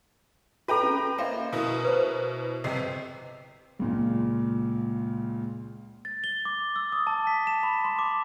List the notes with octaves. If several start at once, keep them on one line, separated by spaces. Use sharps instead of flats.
F#4 A4 B4 G5 A#5
C#4
A#3 C5 D#5 E5 G5
B2 E4 A#4
B4 C5
G1 C3 D#5 G5 C7
C#2 A#2
A6
G7
D6
E6
D#6
A5
B6
E7
B5
C6
D6